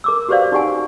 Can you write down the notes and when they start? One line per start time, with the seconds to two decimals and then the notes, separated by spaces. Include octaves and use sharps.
0.04 A#4 D6 E6
0.29 F#4 G4 B4 C5 D5 F5
0.52 D#4 F#4 G4 F#5 G#5